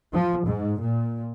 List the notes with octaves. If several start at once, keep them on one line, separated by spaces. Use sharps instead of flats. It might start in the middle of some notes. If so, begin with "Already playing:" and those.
F3
G#2
A#2